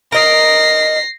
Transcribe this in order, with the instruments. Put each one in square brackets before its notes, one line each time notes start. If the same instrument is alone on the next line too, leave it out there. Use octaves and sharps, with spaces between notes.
[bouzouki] A#4 D#5 [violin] A#6 C7